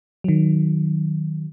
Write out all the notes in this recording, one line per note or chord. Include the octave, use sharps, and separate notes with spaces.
D#3 F#3